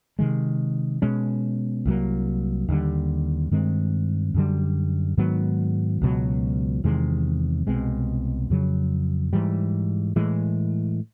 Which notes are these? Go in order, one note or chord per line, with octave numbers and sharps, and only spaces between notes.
C3 D#3 G#3
B2 G#3 C#4
C2 B2 F#3 A#3
D#2 D3 G3
G2 D#3 G#3 C4
F#2 D3 G3
G#2 D#3 F#3 B3
C#2 B2 F#3
E2 C3 D#3 G#3
C2 B2 G#3 C4
F2 C#3 F#3
G#2 E3 G3
A2 E3 G#3